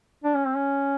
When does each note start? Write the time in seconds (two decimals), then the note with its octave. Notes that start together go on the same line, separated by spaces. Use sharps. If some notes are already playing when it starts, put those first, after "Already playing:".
0.24 D4
0.35 C#4
0.45 C4
0.56 C#4